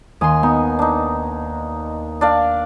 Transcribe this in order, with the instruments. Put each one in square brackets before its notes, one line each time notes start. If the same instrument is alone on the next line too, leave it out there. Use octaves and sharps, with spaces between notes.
[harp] D#2 D#6 [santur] G#5 C6
[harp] B3 [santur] D#4
[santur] D4 D#4
D4 D5 F5